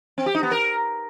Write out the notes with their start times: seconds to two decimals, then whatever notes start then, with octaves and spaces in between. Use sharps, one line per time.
0.18 C4
0.26 G4
0.35 D#4
0.43 B3
0.51 A#4